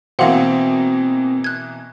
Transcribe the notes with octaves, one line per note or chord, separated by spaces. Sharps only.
B2 E3 A#3 C4 F5 F#5 C6
F#6 G#6